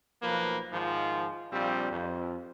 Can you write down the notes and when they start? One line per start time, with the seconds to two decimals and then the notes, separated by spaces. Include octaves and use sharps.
0.22 B1 F3 A#3 B4
0.72 G#2 D#3 F3
1.52 A#1 G3 C4 F4
1.91 F2